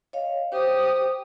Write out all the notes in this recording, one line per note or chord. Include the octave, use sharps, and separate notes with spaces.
C#5 D#5 F5
G4 C5 D#6